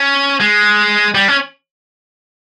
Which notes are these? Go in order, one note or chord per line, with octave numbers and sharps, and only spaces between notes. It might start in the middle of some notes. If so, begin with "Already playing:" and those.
Already playing: C#4
G#3
G3
C#4